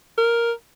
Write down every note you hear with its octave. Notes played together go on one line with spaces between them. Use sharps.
A#4